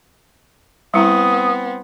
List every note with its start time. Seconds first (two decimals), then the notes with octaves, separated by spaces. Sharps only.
0.94 G3 B3 C4 E4 A#5 D#6